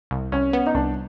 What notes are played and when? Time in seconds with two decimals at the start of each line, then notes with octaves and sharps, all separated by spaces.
0.11 C2
0.32 C2 C#4
0.53 B3
0.67 D#4
0.75 C2 D4